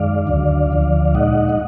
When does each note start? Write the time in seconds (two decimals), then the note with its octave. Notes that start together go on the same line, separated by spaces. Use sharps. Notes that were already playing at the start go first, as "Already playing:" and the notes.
Already playing: F#2 D#3 G#3 D5 F5
0.27 D2 D3 F#3 D4
0.71 D2 D3 F3
1.05 F5
1.14 A#2 G#3 D#4 D#5 F#5
1.49 D#5